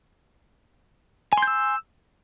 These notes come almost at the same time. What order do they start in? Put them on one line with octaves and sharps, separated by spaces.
G#5 C6 G6 E6